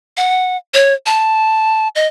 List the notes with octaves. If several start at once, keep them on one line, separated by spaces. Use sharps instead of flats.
F#5
C#5
A5
D#5